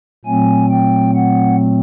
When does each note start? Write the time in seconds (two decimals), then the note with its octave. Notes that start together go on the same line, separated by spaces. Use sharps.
0.25 A#2 F#3 A3 C4 G#5
0.71 G5
1.15 F#5